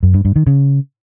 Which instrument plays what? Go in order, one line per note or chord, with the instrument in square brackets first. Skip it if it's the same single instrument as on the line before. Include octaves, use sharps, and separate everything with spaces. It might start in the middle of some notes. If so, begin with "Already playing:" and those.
[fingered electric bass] F#2
G2
G2
D#3
C#3